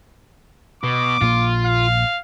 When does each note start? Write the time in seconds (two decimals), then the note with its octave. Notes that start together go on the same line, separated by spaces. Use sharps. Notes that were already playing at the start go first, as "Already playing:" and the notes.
0.84 B2 D6
1.21 A#1 A#2 A#3 F4
1.66 F5